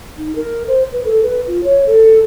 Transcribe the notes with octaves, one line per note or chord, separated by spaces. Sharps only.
D#4
A#4
C5
B4
A4
B4
F4
C#5
A4